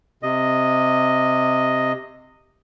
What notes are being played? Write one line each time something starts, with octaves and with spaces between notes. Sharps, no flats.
C3 D#5